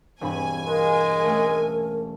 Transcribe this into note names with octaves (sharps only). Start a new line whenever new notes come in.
E1 G2 C4 G#5 B5
G#3 A#3 A#4
A3 C#4